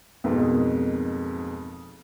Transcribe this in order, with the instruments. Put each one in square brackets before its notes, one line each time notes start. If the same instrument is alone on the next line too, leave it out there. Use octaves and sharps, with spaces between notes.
[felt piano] B1 F2 G#2 B2 A#3